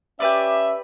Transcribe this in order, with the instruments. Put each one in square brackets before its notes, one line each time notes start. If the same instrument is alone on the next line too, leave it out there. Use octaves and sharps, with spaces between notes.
[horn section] C#4 E5 [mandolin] G4 B4 D5